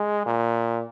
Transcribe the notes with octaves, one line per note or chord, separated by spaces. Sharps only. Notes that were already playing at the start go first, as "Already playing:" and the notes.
Already playing: G#3
A#2